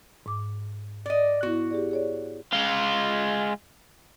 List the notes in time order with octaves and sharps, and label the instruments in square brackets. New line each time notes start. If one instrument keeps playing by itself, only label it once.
[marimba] G#2 D6
[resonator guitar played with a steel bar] D5 D#5
[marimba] B3 E4 [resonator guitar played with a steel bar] F#4
[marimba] G4 G#4 D5
G#4 C#5 D5
[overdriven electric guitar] G#3 F4